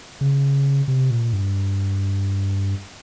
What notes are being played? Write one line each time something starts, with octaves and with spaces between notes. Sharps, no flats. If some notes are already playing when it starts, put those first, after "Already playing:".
C#3
C3
A#2
G2